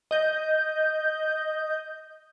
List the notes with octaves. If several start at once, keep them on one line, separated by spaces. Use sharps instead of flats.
D#5 G6